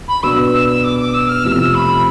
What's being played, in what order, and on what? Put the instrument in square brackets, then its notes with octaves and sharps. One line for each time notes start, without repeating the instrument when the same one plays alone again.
[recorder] B5
[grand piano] B2 B3 D4 [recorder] E6
[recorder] E6
E6
D6
D6
E6
F6
[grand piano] F2 C3 F3 A3 [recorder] E6
[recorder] F6
E6
B5